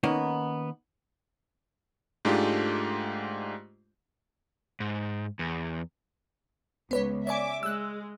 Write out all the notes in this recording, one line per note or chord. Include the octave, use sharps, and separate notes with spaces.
D#3 A#3 B3 C#4 D#4
G#2 G#3 A3 D4 F4 G4
G#2
E2
C#2 B3 B4 C#5
C#5 D5 E5 G#5 D6
G#3 E6 F#6